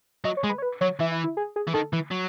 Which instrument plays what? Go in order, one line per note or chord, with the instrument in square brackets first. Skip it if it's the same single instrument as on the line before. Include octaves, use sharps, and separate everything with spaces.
[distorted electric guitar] F#3 [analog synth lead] D#5
[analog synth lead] C#5
[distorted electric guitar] G#3
[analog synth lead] B4
C#5
B4
[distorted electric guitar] F#3 [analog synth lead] C#5
[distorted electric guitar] E3 [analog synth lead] E4
[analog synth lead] E4
E4
G#4
G#4
[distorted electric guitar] E3
[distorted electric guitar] D#3 [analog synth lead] A4
[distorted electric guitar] E3
F#3